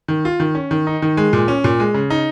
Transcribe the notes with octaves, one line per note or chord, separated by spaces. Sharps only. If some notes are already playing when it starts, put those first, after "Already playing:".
D#3
F4
D#3
C#4
D#3
D#4
D#3
G#3
A#2
C#4
A#2
G#3
C#3
D#4